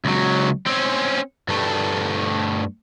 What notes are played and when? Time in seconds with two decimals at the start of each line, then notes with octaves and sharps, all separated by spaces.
0.05 C#2 F#3
0.66 C4 C#4
1.48 G2 A3